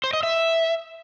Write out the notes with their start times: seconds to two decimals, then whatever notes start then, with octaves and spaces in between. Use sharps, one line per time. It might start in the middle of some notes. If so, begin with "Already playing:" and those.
0.04 C5
0.13 D#5
0.23 E5